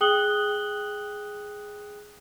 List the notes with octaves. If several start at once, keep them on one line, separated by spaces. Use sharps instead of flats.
G#4 G5 D#6 F#6 F#7 G7